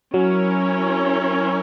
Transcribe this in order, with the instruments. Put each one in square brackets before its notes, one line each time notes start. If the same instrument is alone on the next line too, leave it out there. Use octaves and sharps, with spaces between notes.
[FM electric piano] F#3 [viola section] C#4 E4 A#4 C#5